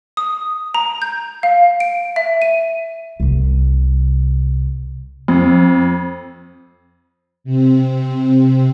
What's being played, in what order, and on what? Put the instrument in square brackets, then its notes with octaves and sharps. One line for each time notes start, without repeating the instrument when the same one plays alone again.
[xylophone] D#6
A#5
G6
F5
D7
E5
D#7
[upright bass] C2 C3
[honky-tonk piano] F2
[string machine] C3 C4